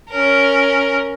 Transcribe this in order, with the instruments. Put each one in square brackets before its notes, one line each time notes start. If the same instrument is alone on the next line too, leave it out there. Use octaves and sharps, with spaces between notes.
[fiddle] C#4 A#4